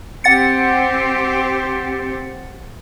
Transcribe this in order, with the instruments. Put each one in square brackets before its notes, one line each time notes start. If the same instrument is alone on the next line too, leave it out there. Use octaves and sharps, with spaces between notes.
[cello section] C4 G4 C5 [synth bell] F#5 A6 C#7